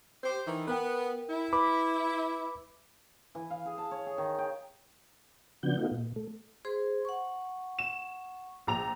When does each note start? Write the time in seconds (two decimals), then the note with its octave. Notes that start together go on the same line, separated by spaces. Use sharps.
0.24 G4 C5
0.46 D#3 E3
0.68 B3 A#4 G5
1.29 E4
1.53 B4 B5 D6
3.35 E3
3.50 F5
3.66 G#4
3.78 A5
3.91 C#5
4.06 G#4
4.18 D#3
4.39 G5
5.63 C#3 F3 B3 D4 F#4 G6
5.77 A3 B3 D#4 F4 F#4
5.91 A#2
6.16 A3
6.65 G#4 C5 C6
7.05 F#5 C#6
7.79 E7
8.67 A#1 A#5 F7